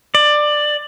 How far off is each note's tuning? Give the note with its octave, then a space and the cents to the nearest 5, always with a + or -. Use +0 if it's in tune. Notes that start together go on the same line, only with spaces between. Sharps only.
D5 +15